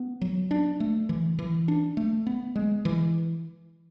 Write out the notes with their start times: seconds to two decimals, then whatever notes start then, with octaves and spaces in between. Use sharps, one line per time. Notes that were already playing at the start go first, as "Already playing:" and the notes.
Already playing: B3
0.21 F#3
0.51 D4
0.80 A3
1.09 E3
1.39 E3
1.68 D4
1.97 A3
2.27 B3
2.56 G#3
2.85 E3